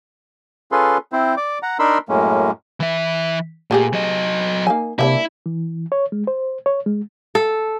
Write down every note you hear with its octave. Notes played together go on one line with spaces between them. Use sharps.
C#4 F4 G#4 A4 B4 C6
C4 E4 C5
D5 D6
F#5 A#5
D4 D#4 A#4 B5 C6 E6
F#2 A2 G#3 A#3 C#4
E3 E5
A#2 A3 G4 G#4
F#3 D#5
A#3 D#4 G#5
C3 G3 A#3 D4 E4
E3
C#5
G#3
C5
C#5
G#3
A4